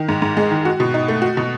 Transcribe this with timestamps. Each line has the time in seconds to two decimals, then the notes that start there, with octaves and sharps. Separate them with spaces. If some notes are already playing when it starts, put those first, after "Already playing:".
Already playing: D#3
0.09 G#2
0.22 G#2
0.37 G#3
0.51 D#3
0.65 F#4
0.80 B2
0.94 D#4
1.08 A3
1.22 F#4
1.37 B2